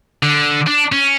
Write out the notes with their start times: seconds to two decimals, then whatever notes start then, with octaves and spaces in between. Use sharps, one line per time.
0.23 D3
0.67 D4
0.92 C#4